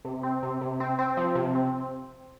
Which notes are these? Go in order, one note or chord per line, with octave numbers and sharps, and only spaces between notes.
C3
C4
C3
C3
C4
C4
F3
C3
C4